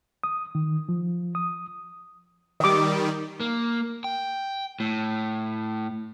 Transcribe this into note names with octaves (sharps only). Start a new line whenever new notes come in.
D#6
D#3
F3
D#6
D#3 G3 D#5 D6
A#3
G5
A2